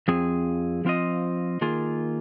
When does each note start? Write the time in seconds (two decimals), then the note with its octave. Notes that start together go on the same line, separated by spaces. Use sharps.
0.08 F2 F3 C4 G#4
0.85 F3 C4 F4 C5 D#5
1.61 D#3 A#3 F4 G#4